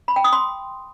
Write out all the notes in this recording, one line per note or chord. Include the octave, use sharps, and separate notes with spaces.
B5
G5
D#6
C6